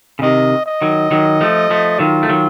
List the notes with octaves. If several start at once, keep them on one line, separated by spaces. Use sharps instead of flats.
C#3
C3 D#3 D#5
D#5
D#3 F#3
D#3 F#3
F3 A3
F3 A3
D#3 F#3 F4
A3
D#3 F#3